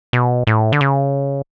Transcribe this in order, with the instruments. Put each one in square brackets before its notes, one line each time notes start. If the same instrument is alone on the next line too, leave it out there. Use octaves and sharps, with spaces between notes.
[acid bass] B2
A2
D3
C#3